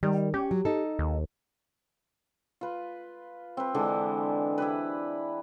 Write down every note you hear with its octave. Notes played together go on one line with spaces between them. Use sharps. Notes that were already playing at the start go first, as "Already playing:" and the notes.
D#3 G3
C#4 G4
F#3
D#4 A4
D#2
F4 B4
C4 B4
D3 E3 G#3 D4
E4 G4 B4